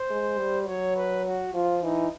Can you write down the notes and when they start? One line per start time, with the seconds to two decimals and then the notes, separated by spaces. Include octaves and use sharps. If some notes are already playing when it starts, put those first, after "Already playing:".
Already playing: C5
0.10 G#3
0.39 G3
0.67 F#3 C#5
0.96 B4
1.25 F#4
1.54 F3 F4
1.83 E3 D#4